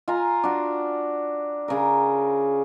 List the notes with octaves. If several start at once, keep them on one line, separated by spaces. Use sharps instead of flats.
F4 G#5 A#5
D4 F#4
C#3 A#4